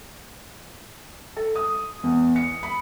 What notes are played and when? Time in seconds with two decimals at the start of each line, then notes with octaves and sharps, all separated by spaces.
1.37 A4
1.56 D#6
2.03 E2
2.36 C#7
2.63 B5